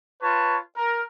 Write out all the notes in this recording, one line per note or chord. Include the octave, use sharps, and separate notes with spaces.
F4 B4 C#5 A5
A#4